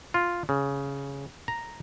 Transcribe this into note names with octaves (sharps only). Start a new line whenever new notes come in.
F4
C#3
A#5